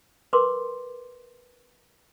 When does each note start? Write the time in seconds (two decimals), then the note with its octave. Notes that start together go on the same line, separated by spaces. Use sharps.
0.33 A#4 B4 C6 D6